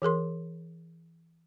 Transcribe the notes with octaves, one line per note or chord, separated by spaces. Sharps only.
E3 G#4 A#4 C6